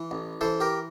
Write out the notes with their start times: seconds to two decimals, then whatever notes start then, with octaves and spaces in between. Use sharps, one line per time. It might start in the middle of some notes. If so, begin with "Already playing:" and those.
Already playing: E3
0.11 A1
0.41 E3 A4 C5
0.60 G4 A#4